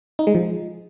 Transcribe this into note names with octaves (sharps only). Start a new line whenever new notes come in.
D#4
G#3
F3